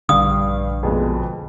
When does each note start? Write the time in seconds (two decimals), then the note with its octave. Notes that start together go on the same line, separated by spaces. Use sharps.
0.09 A#1 G2 D3 F5 D#6
0.83 F2 B2 G#3